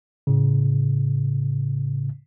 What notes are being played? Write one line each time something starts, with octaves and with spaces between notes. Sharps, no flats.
A2 C#3